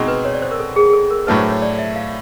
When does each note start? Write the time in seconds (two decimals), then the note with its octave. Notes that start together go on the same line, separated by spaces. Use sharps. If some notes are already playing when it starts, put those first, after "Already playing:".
Already playing: B2 G#3 C4 D#4
0.08 B4
0.25 C#5
0.33 D5
0.42 C5
0.51 A#4
0.60 A4
0.76 G#4
0.89 G#4
0.93 A4
1.10 A#4
1.27 A2 F#3 A3 D4 B4
1.39 C5
1.51 C#5
1.62 D5
1.79 E5
1.96 F5